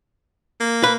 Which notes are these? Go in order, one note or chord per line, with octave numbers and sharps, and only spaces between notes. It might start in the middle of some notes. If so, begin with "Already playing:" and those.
A#3
B4